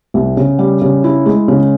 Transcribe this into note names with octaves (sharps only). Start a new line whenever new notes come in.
C2
C#3
G3
C#3
E4
G#3
C#3